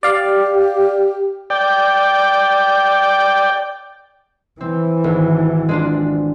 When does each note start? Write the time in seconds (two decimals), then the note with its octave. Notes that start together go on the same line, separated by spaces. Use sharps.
0.03 G4 D5 F5
1.50 D5 G5
4.61 E3 C4
5.04 G#1
5.69 G#3 D4 F4